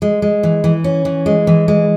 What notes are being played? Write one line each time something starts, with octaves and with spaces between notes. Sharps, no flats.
G#3
G#3
E3
E3
C#4
E3
G#3
E3
G#3